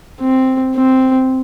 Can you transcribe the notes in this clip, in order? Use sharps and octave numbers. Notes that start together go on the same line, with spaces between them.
C4
C4